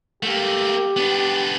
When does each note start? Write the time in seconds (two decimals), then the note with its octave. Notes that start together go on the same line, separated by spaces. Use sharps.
0.23 A3 A#3 G4
0.96 B3 D4